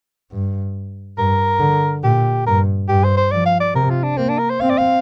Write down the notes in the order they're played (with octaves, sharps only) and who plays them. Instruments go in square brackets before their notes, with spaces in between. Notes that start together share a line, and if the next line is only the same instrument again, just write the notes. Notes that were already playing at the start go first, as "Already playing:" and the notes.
[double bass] G2
[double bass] G2 [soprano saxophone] A#4
[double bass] D3
[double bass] A#2 [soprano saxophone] G4
[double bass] G2 [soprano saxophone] A#4
[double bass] G2 [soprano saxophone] G4
[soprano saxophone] C5
C5
[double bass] F3 [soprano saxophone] D5
[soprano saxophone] F5
D5
[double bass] C3 [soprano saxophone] A#4
[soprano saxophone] F4
D4
[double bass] A#3 [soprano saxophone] C4
[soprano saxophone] D4
A#4
C5
[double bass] C4 [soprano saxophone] F5
[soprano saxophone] D5
F5